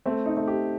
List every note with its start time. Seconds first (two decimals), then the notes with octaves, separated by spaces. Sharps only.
0.06 A3 C4
0.26 D#4
0.37 A3
0.47 G4